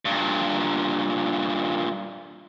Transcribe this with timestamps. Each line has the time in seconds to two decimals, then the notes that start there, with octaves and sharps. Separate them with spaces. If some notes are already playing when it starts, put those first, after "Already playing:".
0.05 G2 A#2